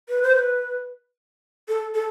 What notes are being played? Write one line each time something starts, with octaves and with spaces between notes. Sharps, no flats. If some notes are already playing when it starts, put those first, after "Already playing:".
B4
C5
B4
A4
A4